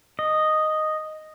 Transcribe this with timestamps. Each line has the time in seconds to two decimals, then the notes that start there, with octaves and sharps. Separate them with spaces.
0.19 D#5